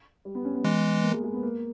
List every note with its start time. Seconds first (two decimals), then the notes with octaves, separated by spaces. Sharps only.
0.25 G3
0.35 B3
0.45 C#4
0.55 B3
0.65 E3 G#3
1.03 A#3
1.13 G#3
1.23 G#3
1.34 B3
1.43 A#3